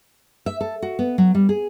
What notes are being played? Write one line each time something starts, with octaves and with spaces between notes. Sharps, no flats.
E5
A4
F#4
B3
F#3
G3
G#4